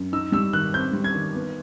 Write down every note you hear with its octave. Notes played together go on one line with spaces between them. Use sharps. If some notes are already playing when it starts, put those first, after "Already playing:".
Already playing: F#2
D#4 E6
G3 E6
D#3 F#6
C4 G6
G3
G#6
D#3
B3